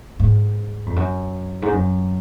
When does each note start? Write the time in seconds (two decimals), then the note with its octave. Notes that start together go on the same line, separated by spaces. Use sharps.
0.20 G#2
0.86 F2
0.96 F#2
1.62 G#2
1.73 F#2